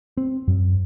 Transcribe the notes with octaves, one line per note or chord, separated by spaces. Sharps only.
C4
F#2